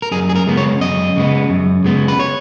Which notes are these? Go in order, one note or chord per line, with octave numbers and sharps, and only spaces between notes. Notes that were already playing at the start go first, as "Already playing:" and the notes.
A#4
F#2 G#4
G#4
A#4
C#3 G#3 B3
C#5
F#2 D#5
C#3 G#3 B3
F#2
C#3 G#3 B3
B4
C#5